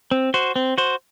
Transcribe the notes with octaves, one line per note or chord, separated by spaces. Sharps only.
C4
F#4 C5
C4
F#4 C5